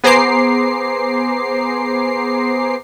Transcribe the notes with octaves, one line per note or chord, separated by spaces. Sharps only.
B3 G#4 C5 A#5 D6 C7